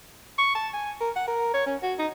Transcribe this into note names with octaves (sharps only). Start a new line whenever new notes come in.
C#6
A5
G#5
A#4
F#5
A#4
C#5
C#4
F#4
D#4